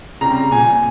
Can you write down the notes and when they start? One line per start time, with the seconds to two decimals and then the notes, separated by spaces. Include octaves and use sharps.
0.21 C#3 G3 C4 A#5
0.51 A#2 G#5